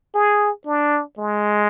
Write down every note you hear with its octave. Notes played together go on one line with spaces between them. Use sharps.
G#4
D4
G#3